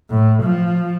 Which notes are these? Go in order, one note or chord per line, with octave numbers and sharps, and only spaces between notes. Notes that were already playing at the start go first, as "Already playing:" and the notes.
A2
F3